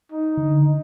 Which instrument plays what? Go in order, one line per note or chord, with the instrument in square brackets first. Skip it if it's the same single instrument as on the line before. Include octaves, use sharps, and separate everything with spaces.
[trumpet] D#4
[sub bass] D3